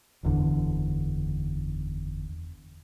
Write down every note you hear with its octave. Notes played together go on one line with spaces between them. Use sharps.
F#1 E2 D3